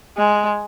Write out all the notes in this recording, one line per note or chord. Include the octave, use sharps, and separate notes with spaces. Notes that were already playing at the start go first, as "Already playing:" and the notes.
G#3